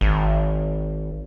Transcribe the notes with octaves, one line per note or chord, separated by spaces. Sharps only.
G#1